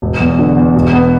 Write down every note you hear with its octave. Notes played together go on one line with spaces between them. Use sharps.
E1
E2
D3
E2
E1
B3